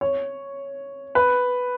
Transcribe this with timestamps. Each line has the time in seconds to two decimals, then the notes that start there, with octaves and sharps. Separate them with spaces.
0.01 C#5
1.15 B4